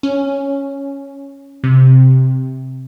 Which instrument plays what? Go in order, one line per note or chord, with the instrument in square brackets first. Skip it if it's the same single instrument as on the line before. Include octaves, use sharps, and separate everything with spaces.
[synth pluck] C#4
C3